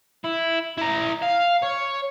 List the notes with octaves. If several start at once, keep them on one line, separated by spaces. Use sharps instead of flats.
E4
E4 A#5
F5
C#5